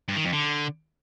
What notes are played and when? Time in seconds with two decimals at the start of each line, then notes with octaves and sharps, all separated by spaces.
0.08 G2
0.17 D#3
0.25 F2
0.33 D3